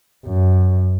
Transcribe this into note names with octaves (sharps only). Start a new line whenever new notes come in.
F#2